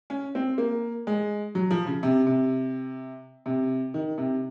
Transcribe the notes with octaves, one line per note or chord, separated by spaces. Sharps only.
C#4
C4
A#3
G#3
F#3
F3
C#3
C3
C3
C3
D#3
C3